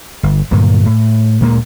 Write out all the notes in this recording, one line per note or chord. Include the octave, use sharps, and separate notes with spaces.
G1
G2 A#2 D3 F#3
A2
D2 A#2 G#3 A#3